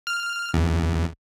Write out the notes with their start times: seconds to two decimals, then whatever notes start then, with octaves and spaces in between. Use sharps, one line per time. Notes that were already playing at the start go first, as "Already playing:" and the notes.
0.07 F6
0.54 E2